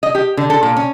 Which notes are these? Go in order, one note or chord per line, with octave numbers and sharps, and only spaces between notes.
D#5
G4
D3
A4
A#2
C#4